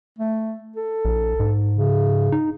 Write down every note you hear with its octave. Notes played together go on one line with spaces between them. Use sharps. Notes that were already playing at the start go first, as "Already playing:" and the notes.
A3
A4
A#1
G#2
C#3
D#4